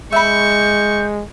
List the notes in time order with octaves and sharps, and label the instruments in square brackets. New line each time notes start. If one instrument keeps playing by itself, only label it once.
[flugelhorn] G#3 [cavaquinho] E5 B5 [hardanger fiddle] C#6 [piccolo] G6